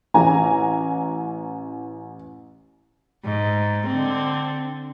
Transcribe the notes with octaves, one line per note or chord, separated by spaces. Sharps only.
A1 G#5 A#5
G#2
D3 C4